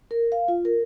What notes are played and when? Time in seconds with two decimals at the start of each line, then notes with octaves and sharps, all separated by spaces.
0.11 A#4
0.32 F5
0.48 F4
0.65 A#4